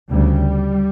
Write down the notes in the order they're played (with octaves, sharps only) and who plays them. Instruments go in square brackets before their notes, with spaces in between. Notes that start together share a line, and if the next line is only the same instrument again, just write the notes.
[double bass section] D2 C#3 G3